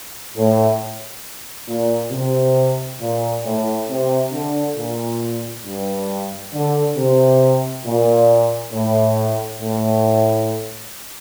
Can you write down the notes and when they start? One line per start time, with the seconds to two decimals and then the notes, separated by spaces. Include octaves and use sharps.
0.37 A2
1.69 A#2
2.12 C3
3.01 A#2
3.45 A2
3.89 C3
4.32 D3
4.76 A#2
5.65 G2
6.54 D3
6.97 C3
7.85 A#2
8.73 A2
9.61 A2